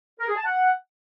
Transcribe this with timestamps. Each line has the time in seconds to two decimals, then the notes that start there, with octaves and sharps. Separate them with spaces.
0.19 A#4
0.28 G#4
0.37 A5
0.45 F#5